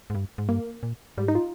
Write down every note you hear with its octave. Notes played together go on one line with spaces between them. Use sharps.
G#2
G2
G#2
G2 A#3
A#2
G#2 G3
D#4
F4